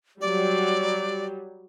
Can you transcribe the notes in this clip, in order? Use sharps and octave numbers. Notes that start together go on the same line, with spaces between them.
F#3 G3 D5